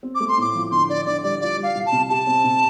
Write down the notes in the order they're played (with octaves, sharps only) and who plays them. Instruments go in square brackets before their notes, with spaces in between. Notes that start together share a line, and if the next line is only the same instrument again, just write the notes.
[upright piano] C4
[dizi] D6
[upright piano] A3
[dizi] C6
[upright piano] A2 [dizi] D6
[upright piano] F3
[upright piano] D3 [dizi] C6
[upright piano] D4 [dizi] D5
[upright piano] D3 [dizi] D5
[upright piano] G3 [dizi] D5
[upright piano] F4 [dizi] D5
[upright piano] G3
[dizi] F5
[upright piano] C2
[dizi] A5
[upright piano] C3
[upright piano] G4 [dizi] A5
[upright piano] C4
C3